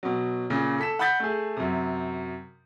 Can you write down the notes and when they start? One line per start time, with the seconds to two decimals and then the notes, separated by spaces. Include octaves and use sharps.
0.03 B2 F#3
0.50 A#2 C#3
0.79 A4 B6 E7
0.99 F#5 B5 D#6 G6 A6 B6
1.20 A3 G#4
1.57 F#2 C3